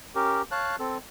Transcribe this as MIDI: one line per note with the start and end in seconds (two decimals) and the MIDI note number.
0.15 0.42 61
0.15 0.42 67
0.15 0.42 70
0.51 0.76 73
0.51 0.76 77
0.51 0.76 81
0.51 0.76 90
0.79 0.98 60
0.79 0.98 69